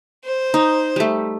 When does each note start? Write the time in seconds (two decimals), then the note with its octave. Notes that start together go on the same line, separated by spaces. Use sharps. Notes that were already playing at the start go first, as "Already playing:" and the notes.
0.25 C5
0.54 D#4
0.96 G3 A3